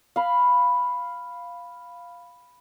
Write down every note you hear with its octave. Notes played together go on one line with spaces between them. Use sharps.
F5 B5